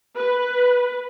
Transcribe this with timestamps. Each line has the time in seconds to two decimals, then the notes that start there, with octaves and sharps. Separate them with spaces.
0.15 B4